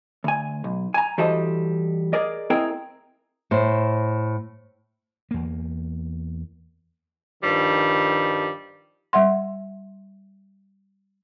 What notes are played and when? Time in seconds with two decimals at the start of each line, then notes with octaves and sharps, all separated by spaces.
0.24 D2 G#5
0.64 B1
0.94 G#5 A#5
1.18 E3 G3 F#4 A4 C5 D#5
2.13 G#4 A#4 D5 D#5
2.50 C4 E4 G#4 A#4 D#5 G5
3.51 A2 C5
5.31 E2 A#3
7.43 G2 D#3 F3 G3
9.13 G3 E5 F#5 C6